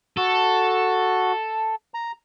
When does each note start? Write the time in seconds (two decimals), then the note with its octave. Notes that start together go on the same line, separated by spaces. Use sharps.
0.17 F#4 A4
1.94 A#5